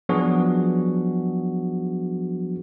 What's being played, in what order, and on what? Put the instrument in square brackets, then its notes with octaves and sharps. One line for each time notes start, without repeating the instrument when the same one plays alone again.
[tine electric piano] F3 F#3 B3 D4 F#4 G#4